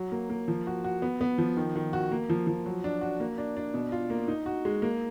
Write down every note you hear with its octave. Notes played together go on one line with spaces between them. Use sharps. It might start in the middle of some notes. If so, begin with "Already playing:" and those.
Already playing: F#3
A#3
A#3
F3
F#4
F#4
B3
B3
F3
D#3
D#3
F#4
A#3
F3
F3
F#3
D4
F#4
A#3
D4
D4
B2
F4
A#3
D#4
F#4
G#3
A#3